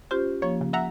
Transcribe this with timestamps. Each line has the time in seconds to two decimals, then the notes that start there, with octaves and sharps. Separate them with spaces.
0.11 C#4 F4 G4 C5
0.42 F3 A#3 C#5
0.61 C#3
0.73 E5 F#5 A#5